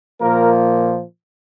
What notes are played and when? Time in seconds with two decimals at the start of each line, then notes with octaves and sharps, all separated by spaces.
0.19 A#2 F3 A#3 A#4